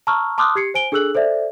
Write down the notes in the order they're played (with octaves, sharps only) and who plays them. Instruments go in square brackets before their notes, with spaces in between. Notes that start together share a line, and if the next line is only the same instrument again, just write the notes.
[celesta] A5 A#5 C#6 E6 F6
A5 C6 D6 D#6 F6 F#6
G4 G#6 C7 C#7
C5 G#5 D7 G7
D4 G#4 A4 E6 F#6 F#7
A4 C5 D5 E5